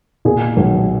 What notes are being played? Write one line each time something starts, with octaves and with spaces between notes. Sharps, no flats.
A#2 G#4
B1